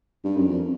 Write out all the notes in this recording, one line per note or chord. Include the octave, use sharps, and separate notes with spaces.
G2
F#2
F2